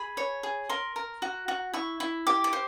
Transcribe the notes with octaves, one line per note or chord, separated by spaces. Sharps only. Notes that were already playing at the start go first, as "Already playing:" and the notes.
Already playing: G#4 B5
C#5
G#4
A#4 C6
A#4
F#4
F#4
E4 C#6
E4
G4 D6
D6
C5